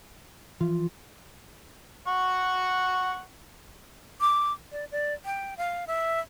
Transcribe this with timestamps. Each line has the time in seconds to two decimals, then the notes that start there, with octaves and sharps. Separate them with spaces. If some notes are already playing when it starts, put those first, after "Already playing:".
0.61 E3 F3 F4
2.07 F#5 C#6
4.21 D6
4.72 D5
4.91 D5
5.25 G5
5.57 F5
5.87 E5